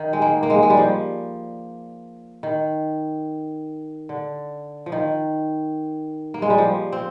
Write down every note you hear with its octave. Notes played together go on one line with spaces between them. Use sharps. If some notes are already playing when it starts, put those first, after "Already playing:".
Already playing: D#3
G#3
A#3
A#3
G#3
G#3
G3
F3
D#3
D3
F3
D#3
A#3
G#3
G3
F3
C4